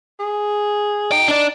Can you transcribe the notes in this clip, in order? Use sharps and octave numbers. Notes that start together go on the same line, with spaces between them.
G#4
D#4 F#4 G5
D4 D5